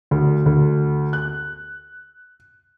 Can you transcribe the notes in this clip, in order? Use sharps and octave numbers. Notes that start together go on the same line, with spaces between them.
D2
D2
F#6